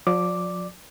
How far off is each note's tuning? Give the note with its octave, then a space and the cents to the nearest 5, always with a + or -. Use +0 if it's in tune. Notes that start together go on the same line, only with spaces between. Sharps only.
F3 +40 D5 +0 D6 +0